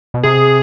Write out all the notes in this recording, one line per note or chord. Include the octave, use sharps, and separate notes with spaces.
B2
C3 G#4